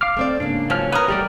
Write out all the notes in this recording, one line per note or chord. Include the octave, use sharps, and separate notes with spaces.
F5 D6 F6
A3 C4 D5
G#2 C#3 A#3 D4
F3 F#3 C#4 F6
B3 A#4 B4 C#5 D#6
G3 A3 D#4 G4 D5 D6